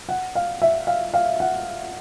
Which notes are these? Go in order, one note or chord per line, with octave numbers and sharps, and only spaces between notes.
F#5
F5
E5
F5
F5
F#5